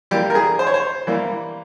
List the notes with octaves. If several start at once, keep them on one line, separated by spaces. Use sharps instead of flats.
E3 G3 A#3 G4
A#4
G#4
C5
C#5
C5
E3 G3 A#3